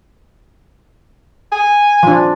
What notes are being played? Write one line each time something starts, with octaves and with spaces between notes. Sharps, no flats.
G#5
F3 D4